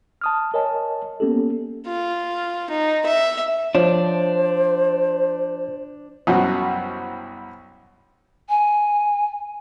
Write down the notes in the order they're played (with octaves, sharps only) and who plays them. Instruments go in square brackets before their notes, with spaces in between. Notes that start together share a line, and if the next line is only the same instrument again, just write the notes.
[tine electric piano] A5 D#6 F6
A#4 C#5 D#5 G#5 A5
A#3 B3 C#4 G4 A4
[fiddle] F4
D#4
E5
[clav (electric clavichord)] F3 [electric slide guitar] D4 [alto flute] C5 [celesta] C#5
[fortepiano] C2 F#2 B2 F#4
[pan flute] G#5